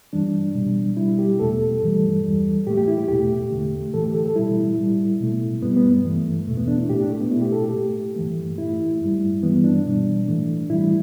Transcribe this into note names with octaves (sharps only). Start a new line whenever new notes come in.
G2 E3 G3 D4
B2 G3
B2 G3 E4
G4
E2 B2 A3 A4
G2 E3 G3
E2 E3 G3
A2 A3 G4
G4
E4
G4
E2 B2 A3 G4
E2 D3 A3
A2 E3 A3 A4
G4
A4
A4
B2 G3 E4
A2 G3
B2 A3
G2 G3 B3
B3
G2 E3 A3
E2 B2 A3
B3
D4
E4
A2 A3 G4
D4
A3
B3
B2 A3 E4
G4
A4
G4
A2 A3
G2 E3 A3
A2 A3 E4
G2 G3
G2 E3 G3 B3
D4
B2 G3
A2 E3 A3
A2 E3 G3 E4